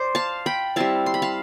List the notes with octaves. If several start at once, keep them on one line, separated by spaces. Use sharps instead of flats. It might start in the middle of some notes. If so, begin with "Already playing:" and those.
Already playing: C5 D5
F5 A5
G5 B5
G3 C4 E4 F5 A5
C6
B5
F5 A5